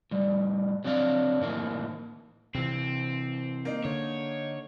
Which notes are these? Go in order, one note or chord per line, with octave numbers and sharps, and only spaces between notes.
A2 G3
F#3 C4 D4 D5 F5
A2 D#3 E3 A#3
C3 E3 C4
A#3 D#4
D3 C#5